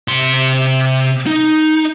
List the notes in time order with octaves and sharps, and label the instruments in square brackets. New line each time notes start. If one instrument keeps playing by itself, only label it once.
[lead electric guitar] C3 C6
D#4